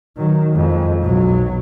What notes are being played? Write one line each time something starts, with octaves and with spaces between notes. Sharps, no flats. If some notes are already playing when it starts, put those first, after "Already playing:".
D#3 F#3
F2 G#3
B1 F#3